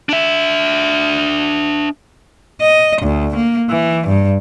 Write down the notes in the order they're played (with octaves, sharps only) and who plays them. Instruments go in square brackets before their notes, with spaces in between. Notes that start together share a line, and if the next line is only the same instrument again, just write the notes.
[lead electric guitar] D4 E5
[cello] D#5
D2
A#3
E3
G2